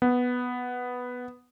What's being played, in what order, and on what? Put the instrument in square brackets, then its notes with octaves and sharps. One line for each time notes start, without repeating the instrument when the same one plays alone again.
[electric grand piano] B3